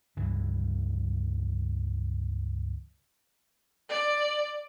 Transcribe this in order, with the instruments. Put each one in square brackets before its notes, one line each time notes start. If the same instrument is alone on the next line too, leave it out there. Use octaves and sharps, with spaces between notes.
[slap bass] C#2 G2 D3 E3
[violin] D5